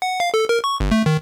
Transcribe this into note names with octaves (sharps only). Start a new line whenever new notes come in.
F#5
F5
A4
A#4
C#6
G1
A3
D#3